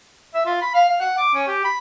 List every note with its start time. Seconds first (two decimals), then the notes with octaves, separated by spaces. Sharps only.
0.34 E5
0.46 F4
0.61 B5
0.74 F5
0.89 F5
1.00 F#5
1.18 D6
1.34 C#4
1.47 G4
1.64 B5